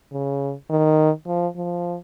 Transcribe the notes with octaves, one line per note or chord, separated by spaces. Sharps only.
C#3
D#3
F3
F3